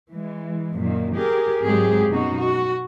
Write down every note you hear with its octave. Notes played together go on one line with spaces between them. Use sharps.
E3 G#3
F#2 A#2 D#3
G4 G#4 A#4
G#2 F#3 G#3 C4 G4 G#4
F#2 B2 D#4 F#4
F#4